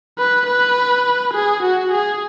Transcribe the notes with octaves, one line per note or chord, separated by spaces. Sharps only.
B4
B4
G#4
F#4
G#4